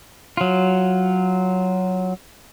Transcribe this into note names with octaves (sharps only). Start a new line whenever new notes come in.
F#3 F4